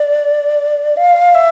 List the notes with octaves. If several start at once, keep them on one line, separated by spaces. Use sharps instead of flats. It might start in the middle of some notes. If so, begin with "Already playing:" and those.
Already playing: D5
F5
E5